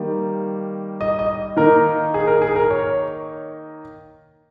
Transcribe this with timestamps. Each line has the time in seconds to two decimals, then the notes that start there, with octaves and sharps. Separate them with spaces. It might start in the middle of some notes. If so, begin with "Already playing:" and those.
Already playing: D#3 G3 A#3
1.01 D#5
1.19 D#5
1.57 D#3 A#3 D#4 A#4
2.14 G#4
2.27 A#4
2.42 G#4
2.56 A#4
2.70 C#5